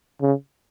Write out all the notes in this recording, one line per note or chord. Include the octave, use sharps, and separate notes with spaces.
C#3